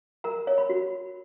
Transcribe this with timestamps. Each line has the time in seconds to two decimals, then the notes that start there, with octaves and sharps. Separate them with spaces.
0.24 A#4 A#5
0.47 C#5
0.58 B5
0.69 F#4